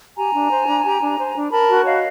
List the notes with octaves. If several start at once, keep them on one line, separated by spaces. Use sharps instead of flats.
G4 G#5 A#5
D4
C5
D4
G4
D4
C5
D4
A#4 A5 B5
F#4
C#5 D#5 F5